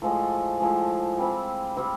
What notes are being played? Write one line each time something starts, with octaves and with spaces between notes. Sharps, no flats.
A2 F3 G#3
A2 F3 G#3
G3 C4 E4
G3 C4 E4